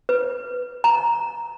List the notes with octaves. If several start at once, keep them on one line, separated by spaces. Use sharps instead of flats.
B4
A#5